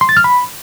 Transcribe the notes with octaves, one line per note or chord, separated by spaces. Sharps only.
C6
A6
F6
B5